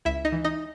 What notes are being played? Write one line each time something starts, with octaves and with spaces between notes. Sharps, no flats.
C#2 E4 E5
D#4 D#5
E3
D#4 D#5